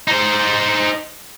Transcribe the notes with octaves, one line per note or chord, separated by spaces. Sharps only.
D#4 C5